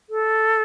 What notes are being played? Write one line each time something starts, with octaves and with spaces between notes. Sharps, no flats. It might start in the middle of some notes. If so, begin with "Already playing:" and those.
A4